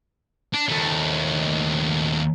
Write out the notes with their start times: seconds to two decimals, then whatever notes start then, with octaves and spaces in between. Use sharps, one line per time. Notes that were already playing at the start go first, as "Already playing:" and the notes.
0.53 D4
0.69 D#2 A3